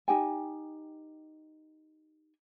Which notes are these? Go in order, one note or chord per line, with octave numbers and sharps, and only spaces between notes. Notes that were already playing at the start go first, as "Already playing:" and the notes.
D#4 G4 G5 G#5